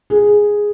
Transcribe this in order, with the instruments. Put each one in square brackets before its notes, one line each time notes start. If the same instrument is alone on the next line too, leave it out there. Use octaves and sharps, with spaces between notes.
[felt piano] G#4